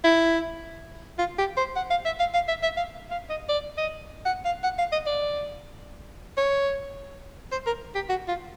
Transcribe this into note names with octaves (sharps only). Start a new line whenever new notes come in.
E4
F4
G4
C5
F#5
F5
E5
F5
F5
E5
E5
F5
F5
D#5
D5
D#5
F#5
F5
F#5
F5
D#5
D5
C#5
C5
A#4
G4
F#4
F4